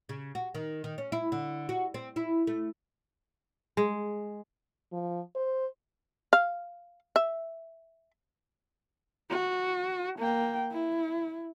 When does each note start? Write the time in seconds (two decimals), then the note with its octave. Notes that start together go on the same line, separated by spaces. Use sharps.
0.09 C#3
0.35 F#4
0.55 D#3
0.84 D#3
0.98 C#4
1.12 E4
1.32 D3
1.69 F#4
1.94 C4
2.16 E4
2.47 A3
3.77 G#3
4.92 F3
5.36 C5
6.33 F5
7.16 E5
9.30 F#4
10.19 A#3 G5
10.71 E4